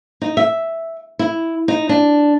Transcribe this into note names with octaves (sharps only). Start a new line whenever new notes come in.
D#4
E5
E4
D#4
D4